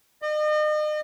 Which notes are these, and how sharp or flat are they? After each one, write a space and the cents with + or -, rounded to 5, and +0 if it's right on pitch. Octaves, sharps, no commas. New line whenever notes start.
D#5 -40